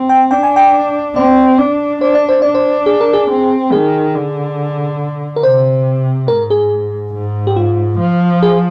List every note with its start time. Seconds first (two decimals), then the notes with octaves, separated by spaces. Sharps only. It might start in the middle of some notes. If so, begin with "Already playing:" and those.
Already playing: C4
0.09 G5
0.31 D4 G5
0.43 G#5
0.56 G5
1.15 C4 D5
1.58 D4
2.01 D4 C5
2.15 D5
2.29 C5
2.42 D4 D5
2.55 C5
2.86 G#4
3.01 A#4
3.13 G#4
3.30 C4
3.72 D#3 G#4
4.15 D3
5.36 A#4
5.43 C3 C5
6.28 G#2 A#4
6.50 G#4
7.14 G#2
7.47 G4
7.56 F4
7.99 F3
8.43 G#4